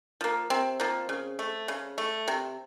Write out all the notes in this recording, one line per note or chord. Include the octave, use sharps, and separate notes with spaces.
F3 A#3
C3 C4
F3 A#3
C#3
A3
C#3
A3
C3